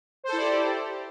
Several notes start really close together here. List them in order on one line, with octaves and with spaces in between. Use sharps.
C5 A4 E4 D5 G4